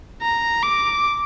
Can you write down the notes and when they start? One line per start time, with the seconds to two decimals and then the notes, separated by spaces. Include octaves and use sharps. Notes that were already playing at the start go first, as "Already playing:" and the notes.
0.22 A#5
0.64 D6